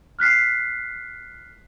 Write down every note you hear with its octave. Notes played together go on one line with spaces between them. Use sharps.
F6 F#6 B6 C7